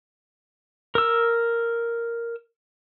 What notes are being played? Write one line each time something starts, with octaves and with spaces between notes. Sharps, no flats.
A#4 E6